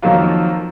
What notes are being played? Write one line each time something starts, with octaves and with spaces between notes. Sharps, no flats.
F2 D#3 F#3 A#3 F4